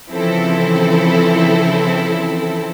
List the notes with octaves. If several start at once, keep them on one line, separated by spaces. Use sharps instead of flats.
C#3 E3 F3 C4 E4 A4